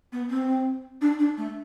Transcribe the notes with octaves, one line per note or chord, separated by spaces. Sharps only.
B3
C4
D4
D4
A3